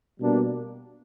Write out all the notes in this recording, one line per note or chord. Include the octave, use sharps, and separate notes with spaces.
B2 G3 A#3 D4